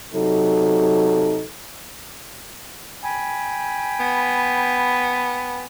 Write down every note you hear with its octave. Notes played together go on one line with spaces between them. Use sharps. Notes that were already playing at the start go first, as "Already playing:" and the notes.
C3 F#3 D#4 A4
G5 G#5 B5
B3